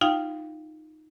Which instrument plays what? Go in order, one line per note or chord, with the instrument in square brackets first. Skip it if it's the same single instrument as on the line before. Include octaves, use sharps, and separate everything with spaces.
[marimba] D#4 F4 F5 G5